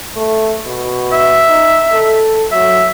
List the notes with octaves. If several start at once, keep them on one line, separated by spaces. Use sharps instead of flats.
A3
B2
E5
D#4
A4
F#3 E5